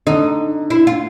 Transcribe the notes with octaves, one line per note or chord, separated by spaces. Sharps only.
D3 D#4
E4
F4